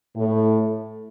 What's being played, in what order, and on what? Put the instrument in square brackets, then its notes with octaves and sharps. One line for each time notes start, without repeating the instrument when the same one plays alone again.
[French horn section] A2